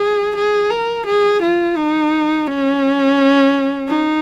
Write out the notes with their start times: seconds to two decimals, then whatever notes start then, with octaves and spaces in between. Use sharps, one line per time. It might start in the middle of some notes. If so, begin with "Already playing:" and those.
Already playing: G#4
0.36 G#4
0.71 A#4
1.06 G#4
1.42 F4
1.77 D#4
2.47 C#4
3.88 D#4